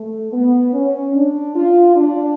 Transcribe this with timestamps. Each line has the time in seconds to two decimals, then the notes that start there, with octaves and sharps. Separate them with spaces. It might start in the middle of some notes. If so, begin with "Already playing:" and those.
Already playing: A3
0.33 B3
0.73 C#4
1.15 D4
1.55 F4
1.96 D4